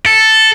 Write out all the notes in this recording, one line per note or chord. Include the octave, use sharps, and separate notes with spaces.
A4